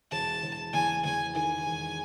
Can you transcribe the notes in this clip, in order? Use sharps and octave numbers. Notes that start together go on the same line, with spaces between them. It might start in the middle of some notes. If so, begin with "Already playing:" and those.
E1 A5
E1
E2 G#5
E2 G#5
D#3 G#5
E1